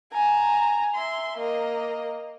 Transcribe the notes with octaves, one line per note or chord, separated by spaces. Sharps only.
G#5 A#5
E5 C6
A#3 D#5